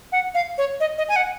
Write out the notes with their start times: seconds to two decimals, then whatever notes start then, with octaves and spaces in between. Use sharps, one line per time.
0.12 F#5
0.34 F5
0.58 C#5
0.80 D#5
0.98 D#5
1.09 G#5
1.16 F#5